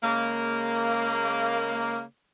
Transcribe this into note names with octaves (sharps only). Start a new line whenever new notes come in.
C#3 G#3 A#3